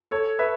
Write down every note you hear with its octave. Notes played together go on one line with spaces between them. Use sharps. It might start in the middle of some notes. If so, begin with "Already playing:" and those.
A4 C#5
B4 E5